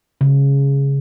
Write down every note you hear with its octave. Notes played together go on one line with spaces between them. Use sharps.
C#3